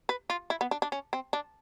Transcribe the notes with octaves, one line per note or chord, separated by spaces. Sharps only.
B4
F4
E4
B3
D4
D4
C#4
C4
D4